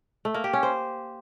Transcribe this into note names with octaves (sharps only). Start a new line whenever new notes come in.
A3
A#3
G4
C#4
C5